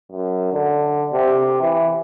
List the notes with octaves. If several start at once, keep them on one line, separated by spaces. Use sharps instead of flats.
F#2
D3
C3
E3